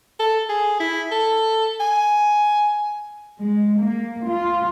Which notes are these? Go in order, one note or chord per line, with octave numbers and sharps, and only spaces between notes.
A4
G#4
E4
A4
G#5
G#3
A#3
F4